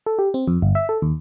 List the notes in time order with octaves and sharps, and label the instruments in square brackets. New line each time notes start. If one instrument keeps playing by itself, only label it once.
[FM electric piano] A4
G4
C4
F2
G1
E5
A4
D#2